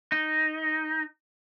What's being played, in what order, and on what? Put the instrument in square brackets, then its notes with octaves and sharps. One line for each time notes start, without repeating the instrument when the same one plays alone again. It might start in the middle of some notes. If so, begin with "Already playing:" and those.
[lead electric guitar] D#4